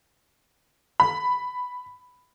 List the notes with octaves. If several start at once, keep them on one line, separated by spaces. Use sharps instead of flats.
B5